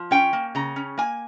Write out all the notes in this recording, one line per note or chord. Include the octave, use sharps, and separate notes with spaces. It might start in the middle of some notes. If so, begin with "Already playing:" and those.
Already playing: F3
C#4 G5
A#3
C#3 A#5
C#4
A#3 G#5